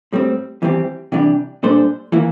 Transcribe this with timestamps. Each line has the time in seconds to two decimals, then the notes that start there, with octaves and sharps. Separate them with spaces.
0.12 A2 G3 C4
0.62 E2 E3 G3 C4 G4
1.12 C3 E3 G3 D4 G4
1.63 A#2 G3 D4 A4 C5
2.12 E3 A#3 E4